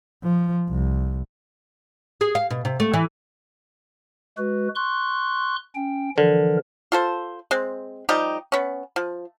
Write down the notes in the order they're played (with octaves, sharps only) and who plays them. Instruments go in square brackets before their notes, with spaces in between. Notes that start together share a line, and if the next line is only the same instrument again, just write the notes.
[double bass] F3
C2
[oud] G#4
F5
B2
C3
A3
E3
[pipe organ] G#3 F#4 B4
C6 C#6 F#6
C#4 G5
[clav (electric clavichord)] D3 [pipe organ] E3 F3 A#4
[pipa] F4 A4 C5
G#3 C4
F3 G3 D#4 G4
B3 C#4
F3